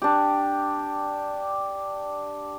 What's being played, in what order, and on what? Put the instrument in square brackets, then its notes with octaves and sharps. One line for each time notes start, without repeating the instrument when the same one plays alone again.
[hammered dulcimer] D4 G4